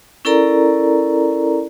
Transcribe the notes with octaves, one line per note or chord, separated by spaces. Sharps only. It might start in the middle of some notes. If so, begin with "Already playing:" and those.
C#4 E4 A4 A#4 D5 A#5